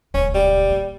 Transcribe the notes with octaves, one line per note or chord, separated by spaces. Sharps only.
D#1 C#2 C#4
G3
A#3